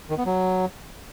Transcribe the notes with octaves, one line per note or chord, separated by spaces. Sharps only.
D#3
B3
F#3